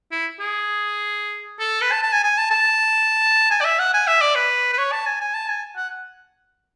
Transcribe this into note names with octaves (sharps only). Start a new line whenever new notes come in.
E4
G#4
A4
B4
A5
A5
G#5
G#5
A5
A5
G#5
D5
E5
F#5
G#5
E5
D5
B4
B4
C#5
A5
G#5
G#5
A5
G#5
F#5